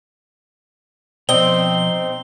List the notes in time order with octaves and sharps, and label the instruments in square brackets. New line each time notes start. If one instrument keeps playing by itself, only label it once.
[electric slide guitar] B2 F3 [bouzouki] C4 D#4 [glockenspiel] G7